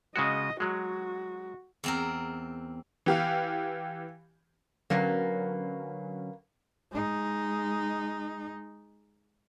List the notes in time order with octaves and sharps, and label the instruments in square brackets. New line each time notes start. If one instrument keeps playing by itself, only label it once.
[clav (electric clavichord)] C#3 G#3 F#4 [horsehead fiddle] D#5
[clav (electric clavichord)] F#3 G#3 [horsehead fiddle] F#4
[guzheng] E2 C4 A#4
[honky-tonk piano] E3 G4 F5
[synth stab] D3 F#3 C#4 [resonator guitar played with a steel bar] A#3 B3
[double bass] G#3 D#4